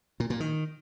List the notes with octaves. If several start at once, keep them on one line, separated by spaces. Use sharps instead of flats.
A#2
A#2
D#3